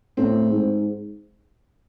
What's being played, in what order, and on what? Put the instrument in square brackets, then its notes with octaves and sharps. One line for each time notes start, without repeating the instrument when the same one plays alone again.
[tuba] A2 [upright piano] C4
[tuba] G#2